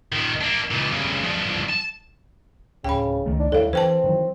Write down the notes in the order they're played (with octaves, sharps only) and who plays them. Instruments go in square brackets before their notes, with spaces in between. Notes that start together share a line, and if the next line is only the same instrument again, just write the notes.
[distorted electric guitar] A#2 D#3
A#3 D4
C#2 A#2
G2 C#3
G2 F3
A5
[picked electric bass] D1 [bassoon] C#3 [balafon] G5 B5
[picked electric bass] C#2 D#3 A3
[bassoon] D4
[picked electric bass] D#2 G3 D4 [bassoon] A2 [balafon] A4 F5
[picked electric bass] E3 [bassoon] C4 [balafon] B4 G5 A5
[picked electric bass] D#3 E3 F#3